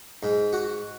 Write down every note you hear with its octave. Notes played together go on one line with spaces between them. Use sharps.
G#2
F#4